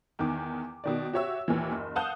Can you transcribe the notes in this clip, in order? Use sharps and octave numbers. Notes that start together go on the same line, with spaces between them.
E2 D#3 D6
B2 D#3 D5
F#4 G4 C#5 E5 E6
D#2 A#2 E3
F#1
F5 F#5 A5 D#6 F#6 G6